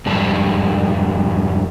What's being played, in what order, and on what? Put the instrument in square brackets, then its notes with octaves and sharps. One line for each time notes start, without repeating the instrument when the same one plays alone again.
[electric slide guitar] F2 G#2 G3 A5